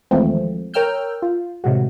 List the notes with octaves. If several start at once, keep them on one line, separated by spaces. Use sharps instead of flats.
D#2 E3 F3 G#3 A3 C4
A#4 C#5 G5 E6 F6 G6
F4
A2 C3 D#3 G#3 F#4